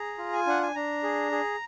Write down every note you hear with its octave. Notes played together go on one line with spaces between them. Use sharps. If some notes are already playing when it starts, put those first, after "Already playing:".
Already playing: G#4 A#5
F4
G#5
D4 F#5
G#5
D4 A#5
G#4
G#4